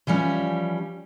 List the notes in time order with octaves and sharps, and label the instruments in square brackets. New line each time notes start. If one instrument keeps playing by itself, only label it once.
[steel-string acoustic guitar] E3 F3 G3 C#4